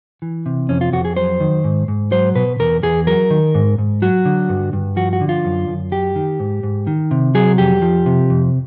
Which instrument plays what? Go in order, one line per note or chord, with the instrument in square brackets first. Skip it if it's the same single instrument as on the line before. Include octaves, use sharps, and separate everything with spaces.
[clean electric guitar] E3
C3
F2 C#4
F4
F2 F#4
G#4
F#3 C5
D#3
G#2
G#2
F#3 C5
B2 B4
E2 A#4
E2 G#4
F#3 A#4
D#3
G#2
G#2
F#3 F#4
D3
G2
G2
F3 F#4
F#4
D3
F4
F#2
F#2
F#3 G4
D#3
G#2
G#2
D#3
C3
F#3 G#4
F2 G4
F3
C3
F2